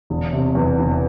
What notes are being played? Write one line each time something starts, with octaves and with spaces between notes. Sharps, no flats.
E1
C3
E2
E1